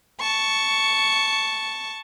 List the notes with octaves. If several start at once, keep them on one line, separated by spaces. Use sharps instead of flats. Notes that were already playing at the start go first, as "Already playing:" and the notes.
A5 C#6